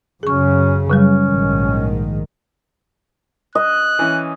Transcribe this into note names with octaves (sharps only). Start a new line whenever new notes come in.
F#2 C#3 C#4 G#4 C#6
C#3 F#3 G3 C#4
A#1 G#2 D#3
D#5 F#6
E3 C#4